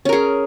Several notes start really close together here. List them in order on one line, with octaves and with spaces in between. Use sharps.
C#4 A#4 G#4